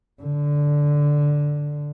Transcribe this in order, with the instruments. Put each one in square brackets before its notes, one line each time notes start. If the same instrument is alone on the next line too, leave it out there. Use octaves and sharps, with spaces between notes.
[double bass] D3